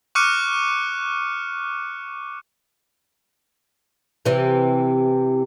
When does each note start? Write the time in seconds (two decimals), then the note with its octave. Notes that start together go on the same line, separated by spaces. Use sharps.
0.15 C#6 D6 F6 F#6 C#7 D#7
4.25 C3 E3